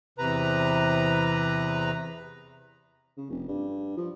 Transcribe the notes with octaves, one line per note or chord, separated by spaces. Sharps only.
E2 C3 B4 A#5
C#3
F1
G2
F3